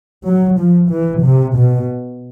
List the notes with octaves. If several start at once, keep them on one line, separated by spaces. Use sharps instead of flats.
F#3
F3
E3
C3
B2